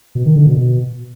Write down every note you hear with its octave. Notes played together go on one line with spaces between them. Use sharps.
B2
D#3
D3
B2
B2